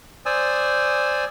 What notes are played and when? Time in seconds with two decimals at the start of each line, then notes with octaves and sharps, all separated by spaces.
0.26 C5 D5 G#5 D#6 E6